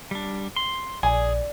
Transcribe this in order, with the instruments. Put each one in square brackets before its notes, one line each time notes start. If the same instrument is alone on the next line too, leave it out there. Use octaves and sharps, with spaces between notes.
[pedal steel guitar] G3 D4
C6
[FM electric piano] A#1 [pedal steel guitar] G#4 [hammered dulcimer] D5 [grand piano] G#5